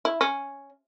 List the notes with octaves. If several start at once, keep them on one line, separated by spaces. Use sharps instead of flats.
E4
C#4